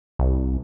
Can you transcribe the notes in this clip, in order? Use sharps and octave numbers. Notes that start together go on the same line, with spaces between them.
C2